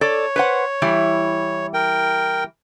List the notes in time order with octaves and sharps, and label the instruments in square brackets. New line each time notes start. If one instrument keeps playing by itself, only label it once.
[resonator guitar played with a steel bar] A4 D5 [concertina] C#5
[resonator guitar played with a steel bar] B4 C5 F#5
E3 G3 E4
[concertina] A#4 G5